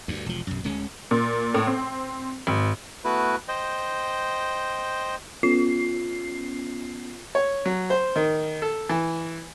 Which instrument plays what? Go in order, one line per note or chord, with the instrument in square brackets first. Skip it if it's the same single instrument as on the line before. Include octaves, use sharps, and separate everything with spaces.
[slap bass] D2 G2
E1 F3
B1 F#2
D1 G#3 C#4
[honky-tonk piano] A#2
A2
C4
G#1
[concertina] A3 B3 E4 F#4 B4
C5 D#5 G5
[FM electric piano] B3 C#4 [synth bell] F4 C7
[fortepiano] C#5
F#3
C5
D#3
A4
E3